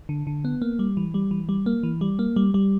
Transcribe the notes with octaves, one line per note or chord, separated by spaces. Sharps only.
D3
D3
B3
A#3
G3
E3
G3
E3
G3
A#3
E3
G3
A#3
G3
G3